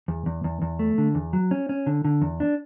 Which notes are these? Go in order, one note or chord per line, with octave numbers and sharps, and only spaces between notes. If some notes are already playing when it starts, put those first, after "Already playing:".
E2
E2
E2
E2
A3
D3
E2
F#3
C#4
C#4
D3
D3
E2
D4